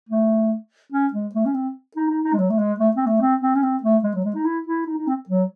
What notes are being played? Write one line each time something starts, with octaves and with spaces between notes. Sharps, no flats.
A3
C#4
G#3
A3
C#4
C4
D#4
D#4
D#4
G#3
F#3
A3
G#3
A3
C4
A3
C4
C4
C#4
C4
A3
G#3
F#3
G#3
D#4
E4
E4
D#4
D#4
C4
F#3